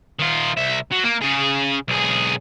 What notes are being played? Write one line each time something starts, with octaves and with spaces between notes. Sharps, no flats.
D#3 F4
C2 E5
F#3
A#3
C#3 G#4
B1 G#4